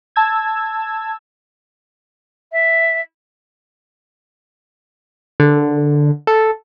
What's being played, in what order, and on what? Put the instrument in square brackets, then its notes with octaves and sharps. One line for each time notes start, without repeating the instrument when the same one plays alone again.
[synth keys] A5 E6 G#6
[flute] E5
[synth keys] D3
A4